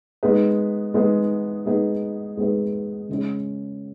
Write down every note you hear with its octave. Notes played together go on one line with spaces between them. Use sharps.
G#3 B3 D#4 G#4 B4
G#3 B3 D#4 G#4 B4
G#3 B3 D#4 G#4 B4
G#3 B3 D#4 G#4 B4
C#3 G#3 C#4